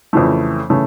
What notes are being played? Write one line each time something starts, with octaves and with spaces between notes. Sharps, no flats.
F2 C#3 E3 A3
C#3 E3 A3